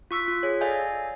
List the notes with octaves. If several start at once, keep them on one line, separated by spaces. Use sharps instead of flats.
F4 C#6 E6 B6
F4
G#4 C#5
A4 D5 D#5 F5 G#5 G6